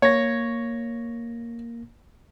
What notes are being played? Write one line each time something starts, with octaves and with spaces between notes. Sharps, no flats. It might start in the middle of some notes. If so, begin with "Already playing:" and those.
A#3 C#5 A#6